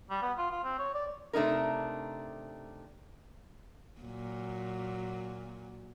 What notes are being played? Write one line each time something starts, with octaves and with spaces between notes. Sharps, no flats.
G3
B3
F4
F4
C4
C#5
D5
C3 A3 D4 D#4 A#4
A#2 F#3